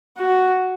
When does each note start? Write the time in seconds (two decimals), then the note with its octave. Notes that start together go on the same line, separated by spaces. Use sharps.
0.17 F#4